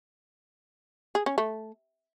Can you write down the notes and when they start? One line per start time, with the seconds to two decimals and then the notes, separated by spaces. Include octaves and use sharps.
1.15 G#4
1.26 C#4
1.38 A3